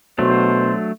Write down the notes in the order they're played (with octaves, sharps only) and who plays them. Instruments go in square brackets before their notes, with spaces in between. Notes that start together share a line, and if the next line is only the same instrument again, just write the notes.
[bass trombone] B2 [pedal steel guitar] F#3 A3 D4 [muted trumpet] C5